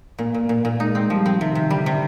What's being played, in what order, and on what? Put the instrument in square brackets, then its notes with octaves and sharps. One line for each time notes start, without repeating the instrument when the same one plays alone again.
[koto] A#2 [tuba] A#3
[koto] A#2
[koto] A#2 [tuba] A#3
[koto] A#2
[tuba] G#3 [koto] D#4
[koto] C4
[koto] F3 [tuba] G3
[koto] C4
[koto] C3 [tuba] D#3
[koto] C3
[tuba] D3 [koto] G3
[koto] C3